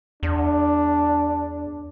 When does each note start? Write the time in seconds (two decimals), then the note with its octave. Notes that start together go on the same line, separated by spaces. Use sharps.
0.23 E2 D4